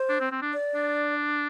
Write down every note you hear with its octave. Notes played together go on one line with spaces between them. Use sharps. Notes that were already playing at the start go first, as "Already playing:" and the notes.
Already playing: C5
D4
C4
C4
D4
D5
D4